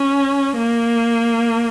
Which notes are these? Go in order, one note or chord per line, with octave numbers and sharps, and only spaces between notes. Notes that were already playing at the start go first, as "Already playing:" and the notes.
Already playing: C#4
A#3